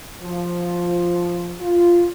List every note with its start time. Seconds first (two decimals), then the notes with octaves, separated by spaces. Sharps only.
0.22 F3
1.60 F4